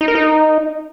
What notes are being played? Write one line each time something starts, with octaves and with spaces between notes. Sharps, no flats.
D#4
A#4
D#4